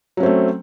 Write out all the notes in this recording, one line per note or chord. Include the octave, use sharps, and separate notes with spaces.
F#3 A3 C4 C#4